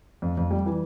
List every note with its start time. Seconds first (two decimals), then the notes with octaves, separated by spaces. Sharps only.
0.22 F2
0.37 F2
0.51 G3
0.66 E3